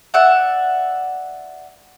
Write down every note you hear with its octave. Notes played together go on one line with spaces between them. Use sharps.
D5 E5 F#5 F#6